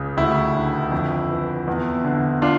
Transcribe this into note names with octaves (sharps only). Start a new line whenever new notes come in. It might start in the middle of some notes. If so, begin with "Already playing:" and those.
Already playing: C#2 C#3
D2 E4
D3
F2
E3
E2
D3
D4 F4